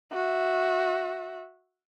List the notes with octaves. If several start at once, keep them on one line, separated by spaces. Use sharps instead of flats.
F#4 E5